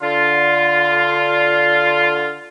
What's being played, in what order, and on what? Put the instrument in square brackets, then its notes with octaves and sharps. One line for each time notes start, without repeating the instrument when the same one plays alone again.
[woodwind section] D3 F4